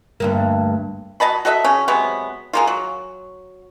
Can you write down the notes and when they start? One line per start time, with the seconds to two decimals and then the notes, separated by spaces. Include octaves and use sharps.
0.20 D2 G2 A#3
1.20 F#3 D#5 A5 B5
1.45 F#4 A4 D#5 E5
1.65 C#3 C#4
1.88 C3 F#3 G#3 B3
2.53 G#3 A#3 F4
2.67 F#3